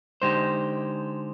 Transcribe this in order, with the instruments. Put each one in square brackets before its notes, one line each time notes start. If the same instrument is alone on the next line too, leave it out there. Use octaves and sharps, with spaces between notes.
[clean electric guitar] D3 G#3 D#4 G4 C5